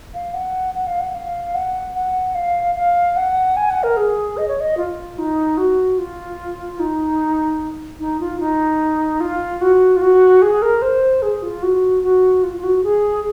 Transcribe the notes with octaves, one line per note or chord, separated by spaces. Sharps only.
F5
F#5
F#5
F5
F#5
F5
F#5
F#5
F5
F5
F#5
G#5
F#5
A#4
G#4
D#5
C#5
D#5
F4
D#4
F#4
F4
D#4
D#4
F4
D#4
F4
F#4
F4
F#4
G#4
A#4
C5
G#4
F4
F#4
F#4
F4
F4
F#4
G#4